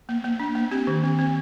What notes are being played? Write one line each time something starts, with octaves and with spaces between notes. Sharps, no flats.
A#3
A#3
D4
A#3
C4 G4
D#3
C4
C4